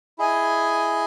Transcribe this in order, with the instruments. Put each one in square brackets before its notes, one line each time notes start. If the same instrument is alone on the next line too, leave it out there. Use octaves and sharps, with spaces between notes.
[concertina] E4 G#4 D#5 G#5